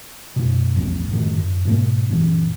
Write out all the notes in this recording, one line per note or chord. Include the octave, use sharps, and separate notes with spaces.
F#2 B2
A#1 E2 A#2
F#2 A2 D#3
F#2
G#2 B2 A3 A#3
F#1 A#2 E3